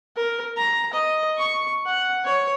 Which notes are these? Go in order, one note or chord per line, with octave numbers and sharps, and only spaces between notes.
A#4
A#5
D#5
C#6
F#5
C#5